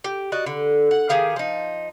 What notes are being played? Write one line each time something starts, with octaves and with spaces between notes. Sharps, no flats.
G4
F#4 D5 D#5
D3
F#5
D#3 G4 G#4 F5
F3 D#4